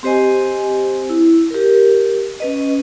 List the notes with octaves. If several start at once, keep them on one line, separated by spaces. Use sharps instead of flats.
C4 G4 C5 D#5 G#5
E4
G4 A#4
C#4 B4 D#5